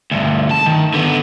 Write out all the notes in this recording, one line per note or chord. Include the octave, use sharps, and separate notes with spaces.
D2 G2
A5
D#3
D3 B3